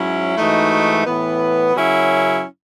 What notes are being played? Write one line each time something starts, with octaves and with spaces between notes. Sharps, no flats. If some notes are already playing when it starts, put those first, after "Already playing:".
Already playing: G#2 F#3 C#4 E4
G#2 E3 A3 D#4 F#4
A2 E3 B3
F#2 C#3 F#3 C#4 E4